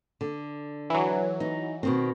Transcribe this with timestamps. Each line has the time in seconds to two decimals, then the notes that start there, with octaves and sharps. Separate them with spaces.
0.21 D3
0.90 E3 F#3
1.40 D#4
1.83 B2 D#3 C4